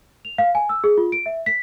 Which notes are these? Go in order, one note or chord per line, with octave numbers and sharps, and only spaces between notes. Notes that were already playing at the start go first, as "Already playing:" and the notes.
F7
F5
G#5
E6
G#4
F4
D7
E5
B6